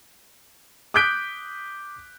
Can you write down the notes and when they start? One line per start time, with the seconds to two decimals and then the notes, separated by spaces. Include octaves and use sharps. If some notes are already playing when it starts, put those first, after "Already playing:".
0.94 D6 D#6 F#6 G6 B6 D7